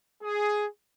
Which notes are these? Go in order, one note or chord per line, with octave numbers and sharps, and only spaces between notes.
G#4